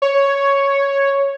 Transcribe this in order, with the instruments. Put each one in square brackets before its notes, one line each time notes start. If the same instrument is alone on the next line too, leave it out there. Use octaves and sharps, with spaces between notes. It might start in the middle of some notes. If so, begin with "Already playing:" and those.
[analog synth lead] C#5